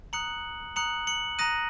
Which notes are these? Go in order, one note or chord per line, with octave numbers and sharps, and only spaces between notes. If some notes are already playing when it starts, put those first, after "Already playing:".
A#5 D#6 F#6 C#7 F#7
A#5 D#6 F#6 C#7 F#7
C#7 F#7
A#5 D#6 F#6 A#6 D#7